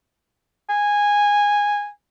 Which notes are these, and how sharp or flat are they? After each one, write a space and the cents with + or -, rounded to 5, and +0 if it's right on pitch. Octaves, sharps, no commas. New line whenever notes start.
G#5 -10